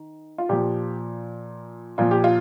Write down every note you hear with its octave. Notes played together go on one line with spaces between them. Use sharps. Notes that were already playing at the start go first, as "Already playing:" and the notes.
Already playing: D#3
F4
A#2 F3 G4
A#2 F3 F4
G4
F4